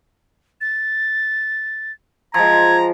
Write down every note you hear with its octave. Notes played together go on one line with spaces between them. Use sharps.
A6
F3 G#3 A#5 G#6